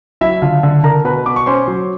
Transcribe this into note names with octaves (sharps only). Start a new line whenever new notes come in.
F#3 E4 E5
D3 F4 F5
D3
D3 A#4 A#5
B2 B4 B5
B2 D6
C#6
C#4 C5 C6
F#3